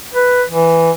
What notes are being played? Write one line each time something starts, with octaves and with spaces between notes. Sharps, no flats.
B4
E3